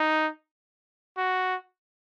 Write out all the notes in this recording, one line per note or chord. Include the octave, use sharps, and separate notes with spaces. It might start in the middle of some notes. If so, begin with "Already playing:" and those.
Already playing: D#4
F#4